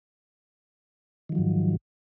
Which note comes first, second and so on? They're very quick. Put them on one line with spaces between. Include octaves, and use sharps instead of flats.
D#3 F3 F#3 G#2